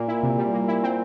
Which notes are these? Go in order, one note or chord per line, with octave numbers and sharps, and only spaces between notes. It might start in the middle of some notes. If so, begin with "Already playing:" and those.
Already playing: A#2 A#3
E4
C3
G3
A#3
E4
C4